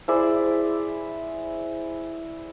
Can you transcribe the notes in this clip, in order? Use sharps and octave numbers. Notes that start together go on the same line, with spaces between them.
E4 G#4 C5 D5